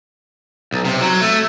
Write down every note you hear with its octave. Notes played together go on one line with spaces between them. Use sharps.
B1
C3
F#3
A3